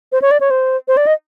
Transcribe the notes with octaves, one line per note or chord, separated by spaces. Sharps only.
C5
C#5
D5
C#5
C5
C5
D5
D#5